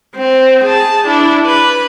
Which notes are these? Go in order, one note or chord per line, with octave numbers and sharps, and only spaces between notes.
C4
G#4 A5
D4 E4
B4